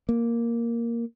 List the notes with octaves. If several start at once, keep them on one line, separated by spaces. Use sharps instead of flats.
A#3